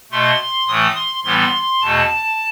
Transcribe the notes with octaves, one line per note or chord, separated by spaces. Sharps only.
B2 A3 C6
A2 E3 A3 D#6
C6
A2 E3 G3 B3 C6
E2 B2 A3 A5